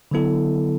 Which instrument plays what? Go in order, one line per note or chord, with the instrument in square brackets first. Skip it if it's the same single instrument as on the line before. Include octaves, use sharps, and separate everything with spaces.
[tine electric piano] D3 F#3 B3 E4 A4